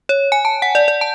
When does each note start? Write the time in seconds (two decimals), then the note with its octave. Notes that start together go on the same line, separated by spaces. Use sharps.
0.09 C#5
0.32 G#5
0.45 A5
0.62 F#5
0.75 D5
0.88 D5
1.01 A5